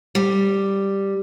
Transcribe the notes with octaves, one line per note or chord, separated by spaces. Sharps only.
G3